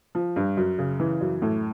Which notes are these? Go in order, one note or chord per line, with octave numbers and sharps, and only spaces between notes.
F3
G2
F#2
C#3
E3
F#2
A2